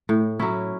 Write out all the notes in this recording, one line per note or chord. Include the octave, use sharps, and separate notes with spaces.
A2
F#3 C#4 E4